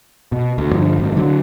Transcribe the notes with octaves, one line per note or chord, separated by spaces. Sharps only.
B2
D2
G2 D3 F3
G#1 F#2
D3 F#3